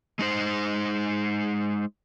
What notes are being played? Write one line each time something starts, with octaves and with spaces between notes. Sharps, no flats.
G#3 D#4 C5